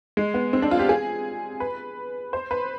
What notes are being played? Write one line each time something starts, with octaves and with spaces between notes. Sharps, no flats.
G#3
B3
C4
D4
F4
G4
G#4
B4
C5
B4